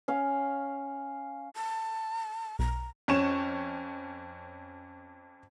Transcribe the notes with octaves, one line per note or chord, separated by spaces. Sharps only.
C#4 F5
A5
B1 A#5
F2 C#4 C#6 E7